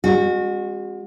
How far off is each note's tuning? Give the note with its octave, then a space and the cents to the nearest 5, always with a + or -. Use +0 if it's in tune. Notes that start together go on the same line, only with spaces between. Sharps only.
G#3 -45 C4 +0 F#4 -20